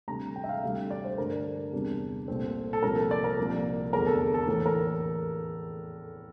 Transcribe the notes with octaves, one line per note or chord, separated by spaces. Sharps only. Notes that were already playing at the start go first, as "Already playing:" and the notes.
D2 C3 G3 D4 A#5
G5
E5
F5
D2 C3 G3 D4
D5
C5
G2 D3 A3 D4 A#4
E2 C3 G3 D4
C2 A#2 A3 C4
A4
C2 A#2 F3 A3 A#4
A4
D5
A#4
C2 A#2 F3 A#3
F1 E2 D3 A3 A#4
A4
A4
A2 E3 A#3 A4
A#4